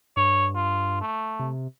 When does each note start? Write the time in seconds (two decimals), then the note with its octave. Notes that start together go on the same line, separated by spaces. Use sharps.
0.17 G2 C#5
0.55 F4
1.01 A3
1.39 C3